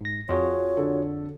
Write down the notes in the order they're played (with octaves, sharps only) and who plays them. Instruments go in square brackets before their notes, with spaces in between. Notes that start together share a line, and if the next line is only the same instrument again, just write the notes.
[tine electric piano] G#2 A#6
[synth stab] F2 [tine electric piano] F4 F#4 G#4 [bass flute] C#5
[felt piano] D3 A4